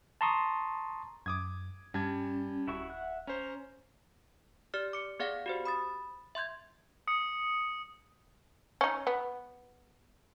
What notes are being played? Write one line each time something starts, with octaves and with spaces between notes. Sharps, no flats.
A5 A#5 C6 C#6 D#6
F#2 D6 D#6 G#6
G2 G3 C#4 A5 G#6
D1 E4 F#4 C#6
E5 F#5 F#6
C#4 C5 A#5
G4 D5 F6
D6 C#7
B3 G#4 D5 F5 F#5 A#6
F#4 G4 C5
B5 D#6 A6
E5 C6 G6 G#6
D#6 C#7
C#4 D#4
B3